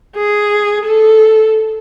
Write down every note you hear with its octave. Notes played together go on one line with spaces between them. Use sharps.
G#4
A4